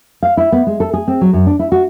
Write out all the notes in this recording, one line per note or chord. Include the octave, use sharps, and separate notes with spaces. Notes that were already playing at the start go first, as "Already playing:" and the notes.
F5
E4
B3
G#3
A4
G#4
C4
F#3
F#2
D4
E4
F#4